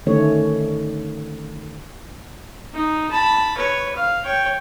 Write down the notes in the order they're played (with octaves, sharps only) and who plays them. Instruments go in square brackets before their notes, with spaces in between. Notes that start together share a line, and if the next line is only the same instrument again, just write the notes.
[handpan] D3 D#3 A3 C#4 C#5
[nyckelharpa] D#4
A5 B5
B4 C#5
F5
C#5 G5